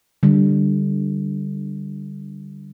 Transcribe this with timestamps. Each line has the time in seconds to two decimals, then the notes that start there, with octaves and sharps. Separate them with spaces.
0.23 D3 G3